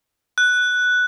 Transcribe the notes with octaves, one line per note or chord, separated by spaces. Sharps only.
F#6